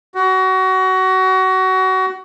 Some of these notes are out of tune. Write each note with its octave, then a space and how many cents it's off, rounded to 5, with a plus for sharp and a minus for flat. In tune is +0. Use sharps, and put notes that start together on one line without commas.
F#4 +25